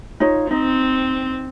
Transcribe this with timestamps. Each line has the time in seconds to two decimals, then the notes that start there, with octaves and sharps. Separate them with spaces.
0.20 D#4 F4 C#5
0.51 C4 D#4